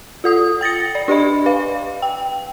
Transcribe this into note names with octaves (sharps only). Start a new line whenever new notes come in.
F4 A4 D#6
G5 A6 A#6 C#7
D5
D4 G4 D5 D#5 B5
B4 F5
G5